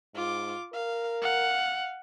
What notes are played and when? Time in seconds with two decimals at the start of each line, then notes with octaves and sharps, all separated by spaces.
0.15 G#2 F4 D6
0.73 A#4 F5
1.22 F5 F#5